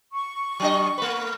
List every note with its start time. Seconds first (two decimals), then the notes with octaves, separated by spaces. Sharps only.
0.12 C#6
0.60 F#3 D4 D#5
0.98 A3 B4